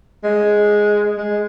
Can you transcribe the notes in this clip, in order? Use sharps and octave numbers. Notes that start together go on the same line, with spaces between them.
G#3
G#3